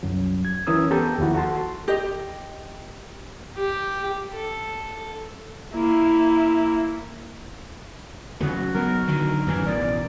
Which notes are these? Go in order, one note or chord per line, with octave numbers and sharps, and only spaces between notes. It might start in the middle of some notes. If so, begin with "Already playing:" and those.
C2 F#2 F#3
G#6
E3 C#4 A#4 D#6 E6
B3 G4 A4 A#5 G6
D#2 F3 E4 F#4
F#4 A4 A5 C6
G4 D#5
G4
A4
A#3 E4
C#3 F#3 A3 F#4
F#3 B3 A#4
D3 D#3 F#3
F#2 A2 D#3 E3
A1 B2 D5